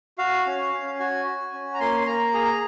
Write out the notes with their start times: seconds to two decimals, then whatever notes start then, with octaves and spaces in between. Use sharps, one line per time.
0.18 F#4 F5
0.46 C#4
0.73 C#4
0.99 F#4 G#5
1.27 F#4
1.53 C#4
1.74 A#5
1.80 A#3 C6
2.01 C6
2.07 A#3 A#5
2.34 G#4 A#5